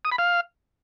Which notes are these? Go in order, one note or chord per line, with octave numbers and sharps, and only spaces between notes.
D#6
B5
F5